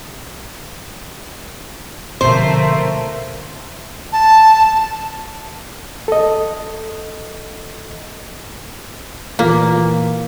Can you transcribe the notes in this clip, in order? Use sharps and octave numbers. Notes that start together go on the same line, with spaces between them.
B2 D3 F3 A3 A#3 C5
A5
A4 D#5
A#2 E3 A#3 B6